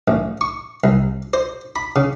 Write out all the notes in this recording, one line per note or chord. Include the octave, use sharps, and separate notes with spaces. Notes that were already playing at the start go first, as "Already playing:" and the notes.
A1
C#6
C2
C5
B5
C#3